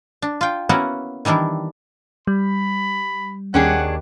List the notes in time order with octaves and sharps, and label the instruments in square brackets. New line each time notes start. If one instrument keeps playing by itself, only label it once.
[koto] D4
F4 G5
A#3 B3 C#4 E4 F#4 F#5
D#3 E3 G3 D4 E4
[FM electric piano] G3 [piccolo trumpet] B5
[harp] D#2 G5 [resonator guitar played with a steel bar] C#4 D4 G#4 [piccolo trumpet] F#5